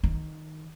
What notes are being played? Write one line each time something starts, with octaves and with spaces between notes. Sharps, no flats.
D#3